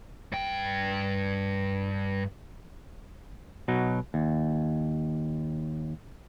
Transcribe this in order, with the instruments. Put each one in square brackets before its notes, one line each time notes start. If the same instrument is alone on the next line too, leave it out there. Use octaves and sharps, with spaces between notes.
[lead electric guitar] G2 G5
[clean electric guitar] B2 F#3 D#4
D#2